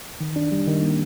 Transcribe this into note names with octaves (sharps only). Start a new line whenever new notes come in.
D#3
D4
G3
D#3
A#3